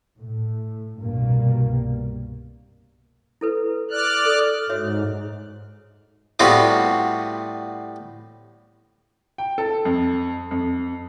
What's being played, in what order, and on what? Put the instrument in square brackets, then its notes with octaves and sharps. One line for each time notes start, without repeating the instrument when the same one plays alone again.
[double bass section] A2
C2 G2 B2 G3 A#3
[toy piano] E4 A4 B4
[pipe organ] D5 F6 F#6
[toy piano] A4 D#6
[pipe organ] G#2 [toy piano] F#4 C#5 E5
[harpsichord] A2 G3 B3 C4 F4 F#4
[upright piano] G5
A4
F2
F2